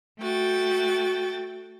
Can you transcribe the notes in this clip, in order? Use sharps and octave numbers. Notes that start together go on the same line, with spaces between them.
A3 F#4 G5 A6